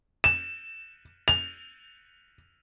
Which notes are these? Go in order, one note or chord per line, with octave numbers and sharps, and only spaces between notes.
E7
F7